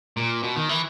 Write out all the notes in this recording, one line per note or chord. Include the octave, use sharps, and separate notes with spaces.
A#2
B2
D#3
E3